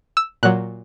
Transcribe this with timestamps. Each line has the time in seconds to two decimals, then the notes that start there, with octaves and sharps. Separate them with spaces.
0.17 E6
0.43 A#2 F#3 F#6